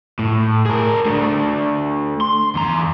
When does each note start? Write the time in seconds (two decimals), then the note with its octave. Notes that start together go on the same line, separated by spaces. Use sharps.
0.19 A2
0.66 G#4 A#4
1.05 A3 D4
2.21 C6
2.55 E2 A#5